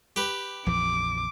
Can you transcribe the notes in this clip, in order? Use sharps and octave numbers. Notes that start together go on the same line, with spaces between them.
G4 B4
A#1 F2 E3 D6